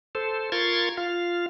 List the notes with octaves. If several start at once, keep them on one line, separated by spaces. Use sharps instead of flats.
A4 C5
F4 A#4 C6 C#6 G#6 A6
F4 F5